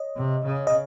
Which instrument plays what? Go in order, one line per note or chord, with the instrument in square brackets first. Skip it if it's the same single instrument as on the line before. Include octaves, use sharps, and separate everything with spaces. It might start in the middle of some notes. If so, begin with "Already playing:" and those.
Already playing: [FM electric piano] C#5 D#5
[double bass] C3
C#3
[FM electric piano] D#5